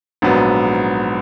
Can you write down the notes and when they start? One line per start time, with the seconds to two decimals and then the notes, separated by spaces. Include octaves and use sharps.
0.22 A#1 G#2 F#3 B3